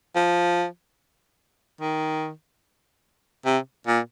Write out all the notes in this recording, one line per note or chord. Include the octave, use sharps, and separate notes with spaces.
F3
D#3
C3
A#2